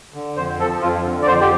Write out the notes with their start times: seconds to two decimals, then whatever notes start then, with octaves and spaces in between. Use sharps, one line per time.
0.14 D3
0.36 F2 C5
0.59 F3 A4
0.81 F2 F4
1.04 D3
1.22 D5
1.27 F2 C5
1.41 G4